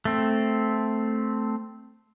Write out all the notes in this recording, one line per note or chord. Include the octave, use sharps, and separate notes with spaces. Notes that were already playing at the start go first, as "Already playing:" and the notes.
A3 C4